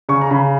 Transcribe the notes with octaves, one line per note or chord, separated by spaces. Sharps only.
C#3 C#6
A#5
C#3 B5